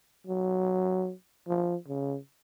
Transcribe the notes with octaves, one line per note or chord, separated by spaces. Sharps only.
F#3
F3
C#3